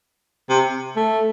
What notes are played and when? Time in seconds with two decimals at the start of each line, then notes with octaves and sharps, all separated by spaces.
0.50 C3
0.96 A3